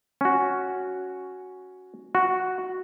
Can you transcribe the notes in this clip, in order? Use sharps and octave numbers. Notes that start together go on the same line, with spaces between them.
C#4 F#4
F#4